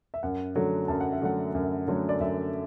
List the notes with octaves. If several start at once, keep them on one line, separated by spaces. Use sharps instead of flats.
E5
F#2 F#5
D3 F#3 A3
F#2 A5
F#5
E5
D3 F#3 A3 F#5
F#2
D3 F#3 A3
D5
F#2 E5